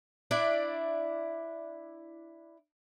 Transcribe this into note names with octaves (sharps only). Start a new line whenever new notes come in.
D4 E4 D5